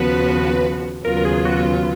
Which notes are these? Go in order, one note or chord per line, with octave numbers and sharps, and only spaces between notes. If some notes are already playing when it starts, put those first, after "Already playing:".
Already playing: D#2 C#3 F3 B3 F#4 B4
D#2 C#3 F#3 B3 F4 A#4
A#4
G#4
F#4